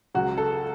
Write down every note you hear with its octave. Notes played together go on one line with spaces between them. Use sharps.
C#2 C#3 F#3 F#4
A4